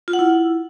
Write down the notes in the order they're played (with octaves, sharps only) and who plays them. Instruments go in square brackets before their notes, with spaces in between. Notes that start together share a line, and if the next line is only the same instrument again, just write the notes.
[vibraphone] F4
F#5
E4